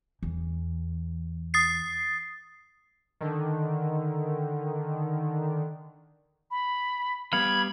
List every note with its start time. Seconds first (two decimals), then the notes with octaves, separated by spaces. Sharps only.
0.23 E2
1.54 D#6 A6 C7
3.21 D3 D#3
6.51 B5
7.33 G3 B3 F5 B5 G#6